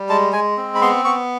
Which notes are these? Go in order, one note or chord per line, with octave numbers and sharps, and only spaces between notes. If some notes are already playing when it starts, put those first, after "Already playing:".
Already playing: G3
G#3 A5
G#3 G#5
C4
B5
B3 C6
B3 C#6